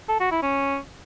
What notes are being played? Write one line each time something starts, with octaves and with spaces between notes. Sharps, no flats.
A4
F#4
E4
C#4